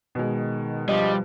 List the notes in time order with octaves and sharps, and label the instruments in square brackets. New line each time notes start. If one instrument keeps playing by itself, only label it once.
[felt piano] B2 G#3 [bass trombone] D#3
[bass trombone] F3 [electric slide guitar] G3 [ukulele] D4 D#5